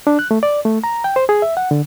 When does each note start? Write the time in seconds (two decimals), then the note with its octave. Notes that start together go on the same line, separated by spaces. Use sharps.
0.07 D4
0.19 F#6
0.31 A3
0.43 D5
0.65 A3
0.84 A#5
1.04 G5
1.16 C5
1.29 G#4
1.42 E5
1.57 F#5
1.71 D3